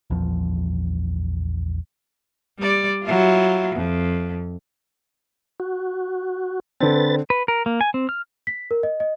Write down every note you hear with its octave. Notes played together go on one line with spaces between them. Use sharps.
A#1 E2 F3
G3 D5
F#3 E4 F4
F2
F#4
D3 C4 B4 A6
B4
A#4
A#3
G#5
C4
F6
B6
A#4
D#5
D#5